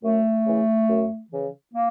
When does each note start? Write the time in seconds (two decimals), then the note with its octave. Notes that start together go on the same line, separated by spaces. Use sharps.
0.03 F#2 A3
0.45 C#3 E3
0.88 F#2
1.31 C#3 E3
1.74 A#3